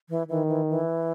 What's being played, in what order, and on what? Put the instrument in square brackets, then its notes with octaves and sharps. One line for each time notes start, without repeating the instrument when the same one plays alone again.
[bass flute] E3
[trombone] D#3 [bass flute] E3
[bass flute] E3
E3